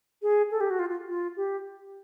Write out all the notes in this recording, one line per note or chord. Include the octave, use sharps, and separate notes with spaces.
G#4
A4
G4
F#4
F4
F4
F4
G4